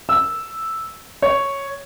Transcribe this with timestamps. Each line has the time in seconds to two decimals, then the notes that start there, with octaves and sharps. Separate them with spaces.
0.09 E6
1.22 C#5